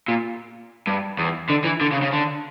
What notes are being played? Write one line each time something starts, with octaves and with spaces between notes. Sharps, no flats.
A#2
G2
E2
D3
E3
D3
C#3
C#3
D3